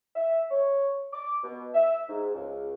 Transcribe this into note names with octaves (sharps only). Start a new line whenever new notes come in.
E5
C#5
D6
B2
E5
G#2
C#2